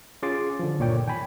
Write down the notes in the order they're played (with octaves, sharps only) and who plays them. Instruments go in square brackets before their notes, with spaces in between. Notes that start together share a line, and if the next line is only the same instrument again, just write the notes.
[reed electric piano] C#4 F4 G#4 C6 D6 A6
D3 F3
C#2 G2 A#2 C#5 D5 G5
D#3 G5 G#5 B5